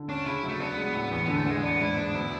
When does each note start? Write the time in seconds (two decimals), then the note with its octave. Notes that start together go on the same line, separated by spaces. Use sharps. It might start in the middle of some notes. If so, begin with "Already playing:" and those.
Already playing: D3
0.09 C#4 D4
0.26 C#3 E4
0.43 F#3
0.49 A3
0.60 B3 D4
0.77 G#3
0.94 A2
1.11 E2 B3
1.25 D3 B3
1.37 A3
1.45 E2 G#3
1.63 B3 D4
1.80 G#2 E4
1.97 B3 D4
2.14 D2 E4